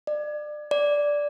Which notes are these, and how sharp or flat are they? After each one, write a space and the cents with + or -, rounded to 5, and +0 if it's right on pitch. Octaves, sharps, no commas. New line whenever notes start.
D5 +30
D5 -5